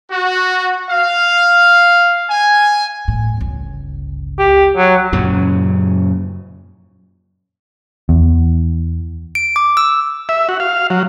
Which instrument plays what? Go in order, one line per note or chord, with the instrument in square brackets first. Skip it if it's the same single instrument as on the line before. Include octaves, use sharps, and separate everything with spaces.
[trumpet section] F#4
F5
G#5
[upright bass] A2
G1 C#2
[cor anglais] G4
F#3
[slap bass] F#2 A#2 C#3
[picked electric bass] E2
[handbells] D7
D6
E6
[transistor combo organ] E5
F#4
F5
F#3